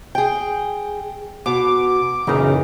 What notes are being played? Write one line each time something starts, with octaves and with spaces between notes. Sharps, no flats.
G#4 G5
B2 D6
F#2 A#2 C#3 E3 D#4